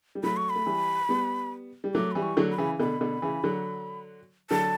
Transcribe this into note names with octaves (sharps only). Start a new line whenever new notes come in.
G3
F#3 A3 B5
C#6
B5
A3
E3 G3
G3 B3
G3
F#3 A3 D6
E3 G3 B5
C#6
D3 F#3
B5
C#3 E3
B2 D3 B5
B2 D3
C#3 E3
D3 F#3
D3 F#3 A5